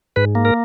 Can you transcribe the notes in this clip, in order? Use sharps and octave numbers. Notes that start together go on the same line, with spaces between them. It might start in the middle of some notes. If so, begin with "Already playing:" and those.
G#2 B4
A#3
A#4